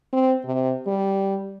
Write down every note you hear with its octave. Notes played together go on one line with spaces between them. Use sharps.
C4
C3
G3